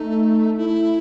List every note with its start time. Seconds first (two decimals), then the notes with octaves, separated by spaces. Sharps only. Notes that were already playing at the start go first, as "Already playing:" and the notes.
Already playing: A3 D#4
0.57 E4